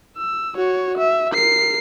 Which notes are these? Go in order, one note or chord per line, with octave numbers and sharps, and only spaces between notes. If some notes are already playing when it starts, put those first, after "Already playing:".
E6
F#4 C#5
E5
A#4 C7